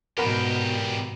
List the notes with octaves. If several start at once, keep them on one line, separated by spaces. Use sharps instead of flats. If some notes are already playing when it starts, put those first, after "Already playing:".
E2 G#2 B2 G4 A#4 F#5 B5